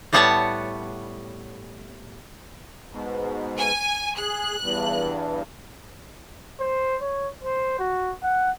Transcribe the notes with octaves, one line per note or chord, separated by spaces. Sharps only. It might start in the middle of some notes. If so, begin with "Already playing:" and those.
A2 G3 B3 C#5 F#5 A5
G#2 B2
G#5
G#4 F#6
E2 G2
C5
C#5
C5
F#4
F#5